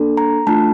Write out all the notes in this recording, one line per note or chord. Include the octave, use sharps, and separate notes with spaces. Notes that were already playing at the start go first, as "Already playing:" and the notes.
Already playing: A#3 D4 A4
A#5
A3 D4 F4 A5